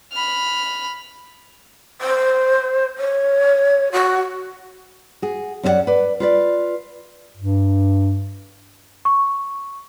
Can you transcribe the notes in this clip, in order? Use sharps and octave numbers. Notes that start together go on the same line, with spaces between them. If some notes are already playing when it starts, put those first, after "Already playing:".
B5 F6
C5
C#5
F#4
F#4 G#4
F#2 C#4 E4 F#4 D5 F#5
B4 D5
F4 B4 D5
G2
C#6